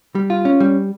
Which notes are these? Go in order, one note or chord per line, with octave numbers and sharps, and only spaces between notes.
G3
F4
C#4
G3